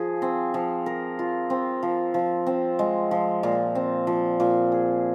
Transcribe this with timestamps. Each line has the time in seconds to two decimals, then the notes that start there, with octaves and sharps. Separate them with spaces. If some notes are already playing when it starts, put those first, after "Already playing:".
Already playing: F3 G#4
0.22 C4
0.54 F3
0.86 A#4
1.19 F4
1.50 C4
1.83 F3
2.14 F3
2.47 C4
2.79 G#3
3.11 F3
3.43 A#2
3.75 C4
4.07 F3
4.40 A#2
4.72 G#4